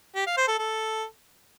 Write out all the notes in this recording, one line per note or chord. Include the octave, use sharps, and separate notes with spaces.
G4
F5
C5
A4
A4